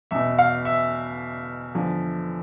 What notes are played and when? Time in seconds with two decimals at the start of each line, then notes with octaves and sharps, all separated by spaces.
0.11 E2 B2 E5
0.38 F5
0.65 E5
1.75 E2 D3 F3